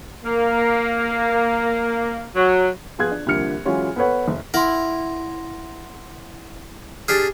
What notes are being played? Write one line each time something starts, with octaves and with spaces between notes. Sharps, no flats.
A#3
F#3
F3 B3 F4 G#4 F#6 G#6
D4
C2 D3 F3 A#3 F6 C#7
E3 F#3 G#3 C#4 F4 C#5
B3 A4 B4 C#5 F#5
F#1
E4 A#4 F#5 C6
D4 G4 G#4 F6 A6